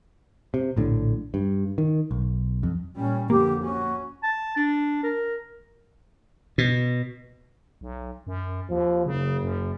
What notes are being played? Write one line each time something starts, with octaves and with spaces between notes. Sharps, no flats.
C3
A#1 A2 D3
G2
D#3
B1
F2
A#2 G3 C#4
F2 D3 A#3 G4
C#4 F#4
A5
D4
A#4
B2
B1
F#2
D#2 F3
F#1 C#3
F#2